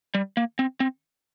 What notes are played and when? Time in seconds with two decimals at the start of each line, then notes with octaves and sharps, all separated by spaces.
0.15 G3
0.37 A#3
0.59 C4
0.80 C4